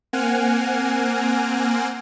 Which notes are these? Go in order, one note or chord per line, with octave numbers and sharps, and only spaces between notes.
A#3 C4 F#5 G#5 F6